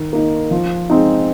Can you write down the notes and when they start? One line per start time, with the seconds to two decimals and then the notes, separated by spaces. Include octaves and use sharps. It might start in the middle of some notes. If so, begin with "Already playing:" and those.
Already playing: D#3
0.13 A#3 D#4
0.51 F3
0.90 G#3 C4 D#4